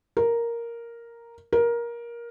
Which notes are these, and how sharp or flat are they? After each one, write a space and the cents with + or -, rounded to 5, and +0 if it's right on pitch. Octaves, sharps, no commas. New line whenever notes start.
A#4 +0
A#4 +15